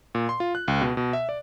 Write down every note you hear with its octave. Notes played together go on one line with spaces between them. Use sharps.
A#2
C6
F4
F#6
C#2
B2
B2
E5
D5